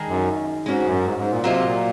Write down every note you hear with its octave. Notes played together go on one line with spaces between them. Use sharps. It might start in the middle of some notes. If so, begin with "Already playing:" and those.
Already playing: D#3 G#3 D#4 G#4
F#2
G#2 G#3 C#4 F#4
F#2
G#2
G#2
A#2
C3 F#3 A#3 F4 C5 D#5
A#2